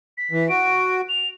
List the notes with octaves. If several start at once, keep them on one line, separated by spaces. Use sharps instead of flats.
B6
E3
F#4 D7
F7